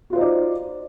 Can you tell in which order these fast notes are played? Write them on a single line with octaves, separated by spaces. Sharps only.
F#4 F4 C5 D#4 D5